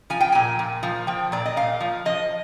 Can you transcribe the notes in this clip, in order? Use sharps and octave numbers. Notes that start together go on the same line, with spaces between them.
F3 G#5
G5
A#2 G#5
A#2
F3
F3 G5
A#2 D5
D#5
A#2 F5
F3
F3 D#5